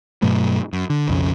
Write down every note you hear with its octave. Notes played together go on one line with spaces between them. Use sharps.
G2 B2 F#3 A3
F#2
D3
B1 F2 C#3